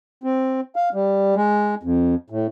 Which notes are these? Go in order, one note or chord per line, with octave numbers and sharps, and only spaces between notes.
C4
F5
G3
G#3
F2
A2